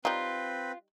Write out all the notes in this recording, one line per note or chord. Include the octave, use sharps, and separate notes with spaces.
G3 C4 D#4 F4 B4